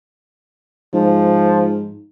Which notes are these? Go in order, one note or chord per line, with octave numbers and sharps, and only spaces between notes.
G#2 F3